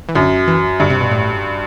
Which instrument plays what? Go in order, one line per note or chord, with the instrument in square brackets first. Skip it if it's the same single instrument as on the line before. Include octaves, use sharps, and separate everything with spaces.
[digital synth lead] E3
[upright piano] F#2 [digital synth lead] D3
[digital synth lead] E3
[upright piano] G2 [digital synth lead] D3
[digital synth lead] C3
B2
A2